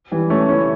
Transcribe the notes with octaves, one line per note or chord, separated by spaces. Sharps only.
E3 G3
A3 C#4
C#4 E4